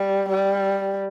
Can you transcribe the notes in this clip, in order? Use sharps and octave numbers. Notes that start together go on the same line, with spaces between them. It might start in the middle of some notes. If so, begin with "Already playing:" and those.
Already playing: G3
G3